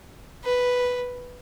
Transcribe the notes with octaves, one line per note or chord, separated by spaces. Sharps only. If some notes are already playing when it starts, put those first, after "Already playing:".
B4